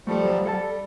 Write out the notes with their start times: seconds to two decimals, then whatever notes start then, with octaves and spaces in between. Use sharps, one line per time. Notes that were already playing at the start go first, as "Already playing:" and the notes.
0.07 F3 G3 A3 A4
0.25 F#3 C5
0.45 G3 A4 F#5 A5